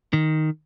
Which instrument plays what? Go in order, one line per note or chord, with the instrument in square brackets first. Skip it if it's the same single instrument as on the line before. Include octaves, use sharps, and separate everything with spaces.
[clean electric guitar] D#3